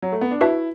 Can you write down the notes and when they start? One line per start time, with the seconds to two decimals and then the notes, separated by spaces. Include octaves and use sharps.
0.02 F#3
0.12 A3
0.21 B3
0.31 D4
0.41 E4 F#4 B4 E5 A5